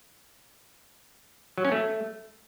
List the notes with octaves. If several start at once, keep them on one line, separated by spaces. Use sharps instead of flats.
F#3
C#4
A3